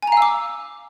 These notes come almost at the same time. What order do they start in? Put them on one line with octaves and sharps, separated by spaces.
G#5 A#5 F5 E6 D6